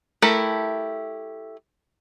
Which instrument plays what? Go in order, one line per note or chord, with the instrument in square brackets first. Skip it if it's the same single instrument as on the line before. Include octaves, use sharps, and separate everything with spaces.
[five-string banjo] A3 E4 G4 A4 A#4